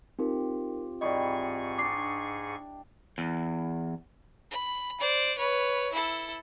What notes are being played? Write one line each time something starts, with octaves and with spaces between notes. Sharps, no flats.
C4 D#4 F4 G4 A#4
G#2 D#3 E3 G3 G#4 D5 D#5 C#6
D4 D6 C7
E2
B5
C5 D5
B4 C#5
E4 A4